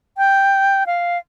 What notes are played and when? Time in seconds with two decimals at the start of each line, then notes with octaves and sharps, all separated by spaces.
0.18 G5
0.86 F5